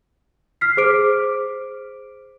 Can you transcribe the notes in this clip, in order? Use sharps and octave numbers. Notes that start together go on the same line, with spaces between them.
F6 B6 C7
G#4 C5 D6 D7